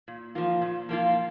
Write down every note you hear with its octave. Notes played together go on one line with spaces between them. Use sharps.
A#2
F3 A#3 F4
A#2
F3 A#3 F4